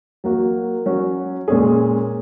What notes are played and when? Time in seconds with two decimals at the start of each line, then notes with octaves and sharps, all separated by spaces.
0.24 F#3 A#3 F#4
0.86 F#3 C#4 F#4
1.48 A#2 G#3 C#4 G#4